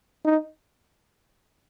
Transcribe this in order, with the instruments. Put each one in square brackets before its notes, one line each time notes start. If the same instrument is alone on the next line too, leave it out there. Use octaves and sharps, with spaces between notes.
[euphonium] D#4